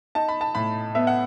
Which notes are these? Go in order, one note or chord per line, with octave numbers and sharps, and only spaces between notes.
D#4 A5
B5
A5
A2 B5
B3 E5
F#5